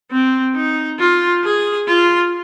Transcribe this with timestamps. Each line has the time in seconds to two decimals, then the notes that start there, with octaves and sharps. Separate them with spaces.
0.11 C4
0.55 D#4
0.99 F4
1.44 G#4
1.87 F4